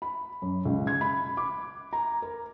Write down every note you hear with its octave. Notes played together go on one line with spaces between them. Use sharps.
B5
F#2
C#2
G#6
B5
D6
A#5
A#4